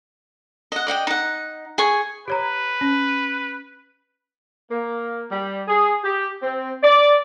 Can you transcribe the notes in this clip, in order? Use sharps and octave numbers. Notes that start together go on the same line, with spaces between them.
D#5 F#5
D5 D#5 F#5 G5
D#4 F#5
G#4 G#5 C#6
G4 B4 C#5 A#5
C#4
A#3
G3
G#4
G4
C4
D5